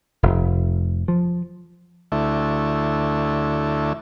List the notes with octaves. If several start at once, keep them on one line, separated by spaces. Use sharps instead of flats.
F1
F3
D2 A3 E4